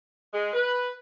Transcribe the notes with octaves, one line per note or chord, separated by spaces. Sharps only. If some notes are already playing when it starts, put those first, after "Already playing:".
G#3
B4